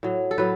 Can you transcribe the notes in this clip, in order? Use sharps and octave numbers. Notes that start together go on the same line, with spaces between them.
A2 F#3
A4
A2 F#3 B4